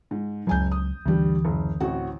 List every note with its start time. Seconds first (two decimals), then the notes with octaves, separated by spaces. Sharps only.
0.11 G#2
0.47 F#1 C#2 F#3 G#5 G6
0.71 D#6
1.06 D2 G2 E3 G3
1.45 F#1
1.80 A1 C4 F#4